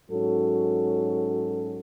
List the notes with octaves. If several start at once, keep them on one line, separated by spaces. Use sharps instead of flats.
G#2 F#3 C#4 F#4 A4